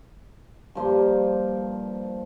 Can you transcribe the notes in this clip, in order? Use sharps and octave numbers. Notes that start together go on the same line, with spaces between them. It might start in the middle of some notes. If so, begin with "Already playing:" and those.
G2 F3 A#3 C6